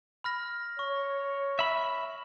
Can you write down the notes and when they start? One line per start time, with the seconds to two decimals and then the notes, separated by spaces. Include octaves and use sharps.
0.24 B5 F6 A#6
0.79 C#5 C#6
1.59 E5 B5